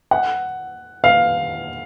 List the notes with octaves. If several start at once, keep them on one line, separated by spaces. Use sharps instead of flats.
F#5
F5